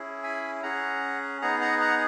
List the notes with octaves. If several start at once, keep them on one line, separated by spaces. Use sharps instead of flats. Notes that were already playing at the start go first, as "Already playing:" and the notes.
Already playing: C#4 E4 G#4
G#5 B5
C#4 G#4 F#5 A#5
B3 D#4 G#4 F#5 A#5
F#5 A#5
F#5 A#5